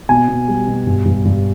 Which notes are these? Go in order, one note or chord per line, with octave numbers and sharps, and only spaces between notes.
B2 G#5
B2
G3
B2
G2
G2
G2